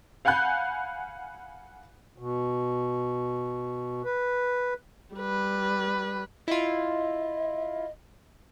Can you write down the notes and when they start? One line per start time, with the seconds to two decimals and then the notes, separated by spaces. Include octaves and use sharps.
0.25 F5 F#5 G#5 B5 F#6 G6
2.18 B2
4.05 B4
5.15 G3 B4
6.48 E4 F4 D#5